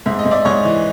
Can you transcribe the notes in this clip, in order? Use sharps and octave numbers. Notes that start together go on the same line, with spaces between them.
G#2 E5
D#5
G#2
D5 E5
G#2 C#5 D#5
E3